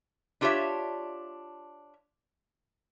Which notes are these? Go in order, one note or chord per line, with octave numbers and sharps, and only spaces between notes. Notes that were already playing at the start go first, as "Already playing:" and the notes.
D4 F4 G4 C5 C#5 E5